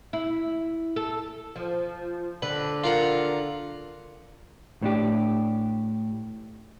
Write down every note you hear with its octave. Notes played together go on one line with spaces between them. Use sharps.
E4
A4
F3
D3 B4
F4 A#4 F#5
A2 D4 G4